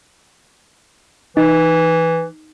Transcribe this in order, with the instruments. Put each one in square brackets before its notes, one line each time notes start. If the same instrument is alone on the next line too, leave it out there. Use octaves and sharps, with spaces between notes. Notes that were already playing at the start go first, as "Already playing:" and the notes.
[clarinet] E3 [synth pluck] D#4